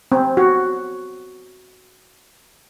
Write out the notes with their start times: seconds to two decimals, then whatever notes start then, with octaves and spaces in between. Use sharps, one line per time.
0.12 C4
0.37 F#4